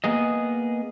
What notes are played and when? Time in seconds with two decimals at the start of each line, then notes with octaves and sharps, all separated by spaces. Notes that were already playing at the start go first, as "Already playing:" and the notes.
0.04 A#3 B3 G#4 D#5